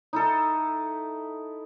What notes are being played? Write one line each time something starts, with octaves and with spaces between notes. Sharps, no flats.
D#4 E4 A4